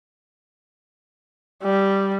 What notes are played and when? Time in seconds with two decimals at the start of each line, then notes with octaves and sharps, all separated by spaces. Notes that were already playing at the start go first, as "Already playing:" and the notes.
1.63 G3